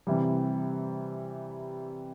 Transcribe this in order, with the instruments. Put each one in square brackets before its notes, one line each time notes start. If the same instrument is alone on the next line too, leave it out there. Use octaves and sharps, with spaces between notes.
[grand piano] C3 E3 G3